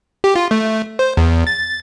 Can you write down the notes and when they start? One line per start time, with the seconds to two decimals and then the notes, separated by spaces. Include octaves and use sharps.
0.24 G4
0.36 F4
0.51 A3
0.99 C5
1.17 E2
1.47 A6